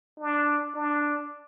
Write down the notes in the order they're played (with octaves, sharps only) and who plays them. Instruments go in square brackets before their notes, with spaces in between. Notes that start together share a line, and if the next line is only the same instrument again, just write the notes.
[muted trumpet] D4
D4